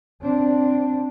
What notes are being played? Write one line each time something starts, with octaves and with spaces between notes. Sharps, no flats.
C4 D4